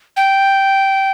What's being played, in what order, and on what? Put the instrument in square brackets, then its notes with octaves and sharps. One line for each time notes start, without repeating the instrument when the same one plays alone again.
[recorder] G5